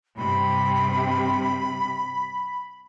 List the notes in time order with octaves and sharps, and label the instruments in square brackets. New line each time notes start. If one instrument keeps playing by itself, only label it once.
[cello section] G2 C3 [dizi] B5